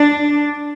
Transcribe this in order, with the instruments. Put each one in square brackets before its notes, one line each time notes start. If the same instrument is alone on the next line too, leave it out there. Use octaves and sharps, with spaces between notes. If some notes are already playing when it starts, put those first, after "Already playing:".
Already playing: [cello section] D4